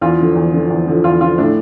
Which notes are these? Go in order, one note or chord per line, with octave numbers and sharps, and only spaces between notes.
E2 F4
D3 F3
E2
D3 F3
E2
D3 F3
E2 F4
D3 F3 F4
A2 D4